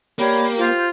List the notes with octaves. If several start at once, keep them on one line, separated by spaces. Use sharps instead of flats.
A#3 G4 C#5 D5 B5
F4 C5 G6